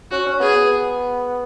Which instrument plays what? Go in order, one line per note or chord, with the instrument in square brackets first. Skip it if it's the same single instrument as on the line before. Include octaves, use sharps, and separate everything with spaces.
[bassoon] C#4 [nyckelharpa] F#4
[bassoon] C#4
[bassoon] B3 [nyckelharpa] G#4
[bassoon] B3